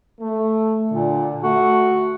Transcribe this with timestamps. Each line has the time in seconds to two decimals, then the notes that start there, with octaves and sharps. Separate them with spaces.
0.21 A3
0.91 A#2 D3
1.44 A3 F#4